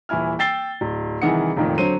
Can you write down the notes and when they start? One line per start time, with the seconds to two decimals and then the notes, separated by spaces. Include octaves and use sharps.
0.09 D#1 E3 E4 G#5 F6
0.39 G5 E6 A6 C7 G7
0.81 D1
1.22 C2 D#3 E3 G#4 F#5 C#7
1.56 F1 F2 A#2 D#3
1.78 D3 F#3 C5 D#7